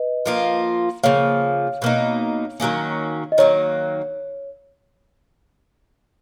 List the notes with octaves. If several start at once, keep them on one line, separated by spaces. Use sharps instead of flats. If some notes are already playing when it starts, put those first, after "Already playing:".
Already playing: B4 D#5
F3 A#3 F4
C#3 F3 A#3 C#5 F5
B2 A#3 D#4
D#3 F#3 A#3 C#4
D#5
D#3 F#3 A#3 C#5